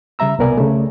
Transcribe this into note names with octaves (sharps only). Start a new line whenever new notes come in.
C#3 G3 E5 A#5 E6
C2 B2 B3 A#4 D5 G#5
C#3 A3